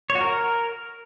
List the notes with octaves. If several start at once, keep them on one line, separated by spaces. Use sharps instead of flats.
C#5
F#4
A#4